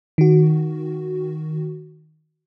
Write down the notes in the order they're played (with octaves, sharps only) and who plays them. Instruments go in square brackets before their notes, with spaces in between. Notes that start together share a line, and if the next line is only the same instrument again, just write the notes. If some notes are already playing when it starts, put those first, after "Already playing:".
[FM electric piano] D#3 F#4